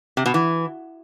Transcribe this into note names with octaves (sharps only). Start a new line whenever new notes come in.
C3
B2
E3